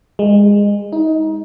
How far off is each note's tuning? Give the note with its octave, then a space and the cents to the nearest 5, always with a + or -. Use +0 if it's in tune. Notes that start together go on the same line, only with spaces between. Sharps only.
G#3 -25
D#4 +25